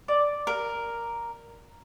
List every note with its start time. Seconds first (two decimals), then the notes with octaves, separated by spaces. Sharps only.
0.08 D5
0.47 A#4